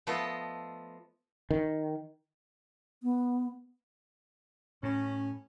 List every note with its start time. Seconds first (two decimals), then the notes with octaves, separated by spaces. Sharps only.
0.07 F3 A3 B3 F4 A4 D#5
1.51 D#3
3.03 B3
4.83 A2 C#4